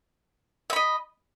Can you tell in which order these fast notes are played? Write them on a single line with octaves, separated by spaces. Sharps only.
E5 B5 D#5